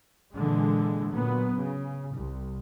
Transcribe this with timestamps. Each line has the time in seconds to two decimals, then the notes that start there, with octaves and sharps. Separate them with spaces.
0.35 A#2 D3 E3 G#3
1.12 A#2 F#3 B3
1.57 C#3
2.15 C2